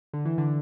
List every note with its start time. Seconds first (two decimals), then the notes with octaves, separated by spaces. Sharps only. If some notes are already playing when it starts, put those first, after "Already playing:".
0.13 D3
0.25 E3
0.38 D3